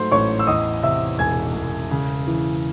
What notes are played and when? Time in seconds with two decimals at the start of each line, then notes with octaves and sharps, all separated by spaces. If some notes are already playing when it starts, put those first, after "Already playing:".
Already playing: G#2 F#3 A3 C5 C6
0.12 A1 C#5 C#6
0.39 E6
0.47 E2 D#5 D#6
0.83 C3 E5 E6
1.19 E1 G#5 G#6
1.55 E1
1.91 C#3
2.27 E3